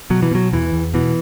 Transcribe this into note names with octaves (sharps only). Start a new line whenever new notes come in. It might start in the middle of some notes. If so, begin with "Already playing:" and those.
B2 F#3
E3
B2 F#3
E2 E3
E2
B2 E3